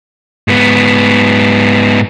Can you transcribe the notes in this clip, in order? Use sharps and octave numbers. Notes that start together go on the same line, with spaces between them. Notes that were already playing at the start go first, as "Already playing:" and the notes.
G#2 B3